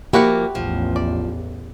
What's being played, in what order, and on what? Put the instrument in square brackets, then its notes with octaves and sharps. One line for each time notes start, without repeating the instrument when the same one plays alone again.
[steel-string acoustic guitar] F3 A#3 [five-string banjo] E4 F#4 F#5 [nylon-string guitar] G4
[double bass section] A1 E2 [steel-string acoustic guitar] F3
[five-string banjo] D5